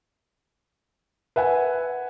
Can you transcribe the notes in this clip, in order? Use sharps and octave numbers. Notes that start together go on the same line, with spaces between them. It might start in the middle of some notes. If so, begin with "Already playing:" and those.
B4 E5 F#5 G#5